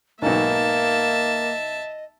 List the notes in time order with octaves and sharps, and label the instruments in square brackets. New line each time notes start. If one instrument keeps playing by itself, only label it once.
[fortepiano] B1 G#2 [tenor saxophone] A#3 [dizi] D#5 [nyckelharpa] E5 A5